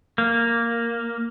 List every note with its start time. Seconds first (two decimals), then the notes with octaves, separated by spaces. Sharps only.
0.18 A#3